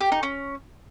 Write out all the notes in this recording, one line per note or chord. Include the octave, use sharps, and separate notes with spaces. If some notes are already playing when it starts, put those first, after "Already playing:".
G4
D#4
C#4